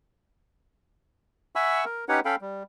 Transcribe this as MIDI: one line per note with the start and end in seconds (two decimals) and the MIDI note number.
1.55 1.85 76
1.55 1.85 78
1.55 1.85 80
1.55 1.85 83
1.55 1.85 85
1.55 1.85 88
1.85 2.05 70
2.09 2.20 61
2.09 2.20 63
2.09 2.20 67
2.09 2.20 71
2.09 2.20 73
2.09 2.20 78
2.25 2.35 61
2.25 2.35 69
2.25 2.35 77
2.25 2.35 79
2.25 2.35 83
2.41 2.63 55